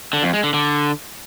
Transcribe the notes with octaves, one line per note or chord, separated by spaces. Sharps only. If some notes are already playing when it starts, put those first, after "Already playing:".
D3
F2
G#3
D3
D3